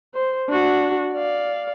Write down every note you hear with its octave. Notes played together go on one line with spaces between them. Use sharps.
C5
D4 F#4
D5 F5